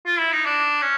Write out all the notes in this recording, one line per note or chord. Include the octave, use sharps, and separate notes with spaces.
F4
E4
D#4
D4
C#4